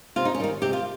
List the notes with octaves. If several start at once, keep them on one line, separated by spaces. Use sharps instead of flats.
C3 F4
D#4
C#4
D#3 G3 D#4
C3 G4
F4